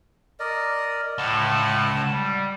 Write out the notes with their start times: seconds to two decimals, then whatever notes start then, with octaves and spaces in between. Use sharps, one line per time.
0.40 A#4 D5 D#5
1.18 C#2 A2 F#5 A5
2.10 G3